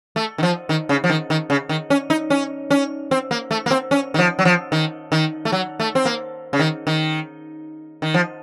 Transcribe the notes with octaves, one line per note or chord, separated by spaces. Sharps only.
A3
D#3
F3
D#3
C#3
F3
D#3
D#3
C#3
D#3
C#4
D#4
C#4
C#4
C4
A#3
A3
A#3
C4
C#4
D#3
F3
F#3
F3
D#3
D#3
A3
F#3
A3
C4
A#3
C#3
D#3
D#3
D#3
F3